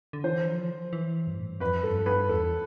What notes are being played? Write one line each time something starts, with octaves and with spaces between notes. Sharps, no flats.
D3
E3 C5
F3
E3
G2
A2
G2
F2 B4
G2 A4
G2 B4
E2 A4